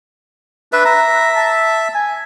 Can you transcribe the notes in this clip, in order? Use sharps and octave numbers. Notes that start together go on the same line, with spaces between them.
D4 B4 E5
E5 A#5
A5
G#5